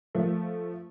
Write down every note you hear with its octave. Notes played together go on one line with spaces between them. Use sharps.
F3 A3